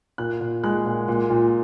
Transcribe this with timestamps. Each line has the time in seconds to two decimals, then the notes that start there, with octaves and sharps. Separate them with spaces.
0.18 A#2 F#6
0.40 A#2
0.64 G#3 F#6
0.86 A#2
1.08 A#2
1.30 A#2